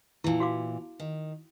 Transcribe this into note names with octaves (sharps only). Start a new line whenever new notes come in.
A#2 E3 E4 A5
F#4 F5 D6
D#3